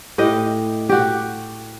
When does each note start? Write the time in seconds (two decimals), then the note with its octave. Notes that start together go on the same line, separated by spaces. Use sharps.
0.18 A2 G4 D#5
0.89 F#4 G4